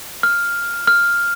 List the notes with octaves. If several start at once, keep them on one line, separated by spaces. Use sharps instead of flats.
F6
F6